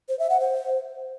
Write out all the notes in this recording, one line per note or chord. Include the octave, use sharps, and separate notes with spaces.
C5
E5
F#5
C5